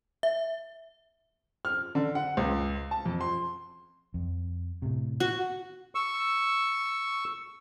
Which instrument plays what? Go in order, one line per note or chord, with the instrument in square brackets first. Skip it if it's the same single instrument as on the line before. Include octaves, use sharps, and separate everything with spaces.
[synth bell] E5
[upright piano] F6
D3
F#5
C#2
A5
F2
C6
[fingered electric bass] F2
A2 C3
[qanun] F#4
[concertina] C#6 E6